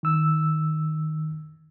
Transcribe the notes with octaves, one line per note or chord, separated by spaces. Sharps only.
D#3 E6